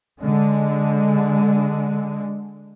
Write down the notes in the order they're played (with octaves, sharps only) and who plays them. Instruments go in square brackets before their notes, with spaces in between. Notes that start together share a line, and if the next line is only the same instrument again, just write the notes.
[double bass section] D3 G#3